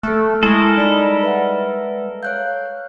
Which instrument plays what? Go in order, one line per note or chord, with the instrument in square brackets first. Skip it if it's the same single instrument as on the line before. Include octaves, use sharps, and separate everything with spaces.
[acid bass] A3 [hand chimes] A4 F#6 [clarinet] F6
[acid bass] G#3 [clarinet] E4 [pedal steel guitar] A4 A#4 [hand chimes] B5
[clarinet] G3 [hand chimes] D#4 B5
[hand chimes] B4 E5 F#5
[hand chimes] C#5 F#6 G6 [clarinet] F5